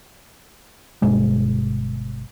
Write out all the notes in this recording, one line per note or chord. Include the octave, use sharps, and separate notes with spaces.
G1 G2 B2 G#3